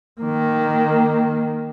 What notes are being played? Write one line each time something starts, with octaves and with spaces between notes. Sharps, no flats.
D#3 A#3